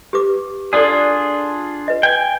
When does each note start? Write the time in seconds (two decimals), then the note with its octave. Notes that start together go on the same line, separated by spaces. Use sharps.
0.13 G4 B4 D6
0.73 D4 F4 G#4 A4 D5
1.88 B4 D#5
2.03 G5 G#5